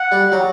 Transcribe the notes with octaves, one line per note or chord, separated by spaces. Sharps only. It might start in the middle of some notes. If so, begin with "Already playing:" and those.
Already playing: F#5
G3
F#3